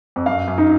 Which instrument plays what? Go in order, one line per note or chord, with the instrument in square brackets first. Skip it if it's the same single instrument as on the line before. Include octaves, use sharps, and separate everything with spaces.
[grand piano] F2
[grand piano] F#2 [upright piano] F5
[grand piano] F#2
[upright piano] D#4